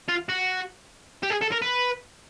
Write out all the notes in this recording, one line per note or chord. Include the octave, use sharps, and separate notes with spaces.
F4
F#4
G4
G#4
A4
A#4
B4